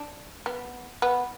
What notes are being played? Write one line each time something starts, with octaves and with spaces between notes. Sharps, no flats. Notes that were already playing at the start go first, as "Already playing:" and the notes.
Already playing: D4
B3
B3